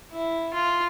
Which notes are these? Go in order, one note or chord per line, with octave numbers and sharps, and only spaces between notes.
E4
F4